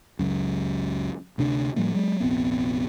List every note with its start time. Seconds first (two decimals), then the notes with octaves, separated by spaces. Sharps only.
0.19 F#1 C#2 F#2
1.38 D2 C3 D4
1.76 A2 F3 G3 A#3
1.94 F#3 G#3
2.20 F1 A#1 B3 C4